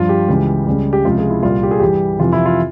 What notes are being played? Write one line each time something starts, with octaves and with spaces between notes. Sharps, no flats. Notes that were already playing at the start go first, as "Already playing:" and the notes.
Already playing: G2 F3 F4
G4
C#2 C#3 E3
C#2 C#3 G3
G4
C#2 C3 F3 F4
G#4
E4
C2 A#2 G3 F4
G4
G#4
G2 E3 G3 G4
F2 C3 E3 F4
E4
F4